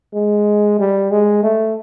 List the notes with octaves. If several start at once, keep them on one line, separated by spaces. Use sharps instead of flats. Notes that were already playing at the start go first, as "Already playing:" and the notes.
G#3
G3
G#3
A3